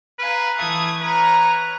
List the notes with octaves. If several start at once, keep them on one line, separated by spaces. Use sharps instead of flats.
B4 F5 G#5 A#5
E3 A3 D#6 G#6
B4 C#5 A#5 F6